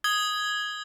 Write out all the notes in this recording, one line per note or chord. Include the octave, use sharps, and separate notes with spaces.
D#6 G#6 G7